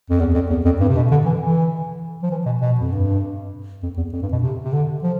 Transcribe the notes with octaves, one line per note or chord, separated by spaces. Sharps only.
F2
E2
F2
E2
F2
G2
C3
B2
D3
E3
E3
F3
E3
B2
B2
F2
G2
F2
E2
F2
G2
B2
C3
C3
D3
F3